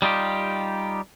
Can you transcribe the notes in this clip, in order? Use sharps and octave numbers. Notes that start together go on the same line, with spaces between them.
G3 D#4 F4 G4